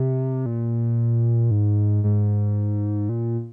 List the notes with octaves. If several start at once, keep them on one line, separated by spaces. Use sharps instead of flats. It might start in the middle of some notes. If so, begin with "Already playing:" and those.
Already playing: C3
A#2
G#2
G#2
A#2